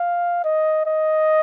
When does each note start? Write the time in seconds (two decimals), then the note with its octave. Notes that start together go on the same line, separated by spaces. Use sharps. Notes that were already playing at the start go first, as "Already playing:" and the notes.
Already playing: F5
0.44 D#5
0.86 D#5